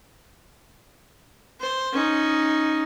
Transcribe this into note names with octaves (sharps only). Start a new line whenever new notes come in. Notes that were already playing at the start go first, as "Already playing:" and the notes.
C5
C#4 D#4